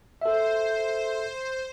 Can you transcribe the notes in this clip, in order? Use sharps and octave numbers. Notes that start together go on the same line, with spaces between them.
A4 C5 E5